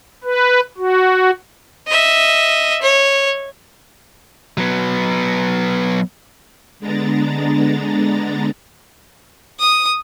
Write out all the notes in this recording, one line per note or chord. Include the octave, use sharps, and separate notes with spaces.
B4
F#4
D#5 E5
C#5
F#3 B3
D3 G#3 B3 D4 A#5 A6
D#6